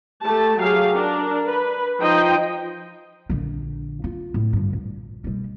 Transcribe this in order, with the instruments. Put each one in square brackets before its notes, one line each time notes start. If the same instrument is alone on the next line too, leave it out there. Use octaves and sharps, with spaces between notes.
[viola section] A3 G4 A5
F#3 G4 G#4 F5
D4 A#4
B4
F3 D#4 C5 D#5 G5
[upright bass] A#1 D3
F4
A2
G2 D3
A#1
B2 G3